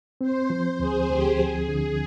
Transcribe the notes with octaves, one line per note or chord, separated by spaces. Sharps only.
C4 C5
F3
D2 G#4
D2 G4
F3 G#4
D3